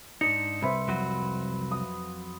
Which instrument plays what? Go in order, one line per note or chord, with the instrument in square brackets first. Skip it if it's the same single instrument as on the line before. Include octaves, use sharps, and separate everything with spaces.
[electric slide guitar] G#2 D4 D#4 [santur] D#5 [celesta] C#7
[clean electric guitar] C2 [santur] B4 C5 E5
[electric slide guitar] F2 F#3 F#4
[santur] D#6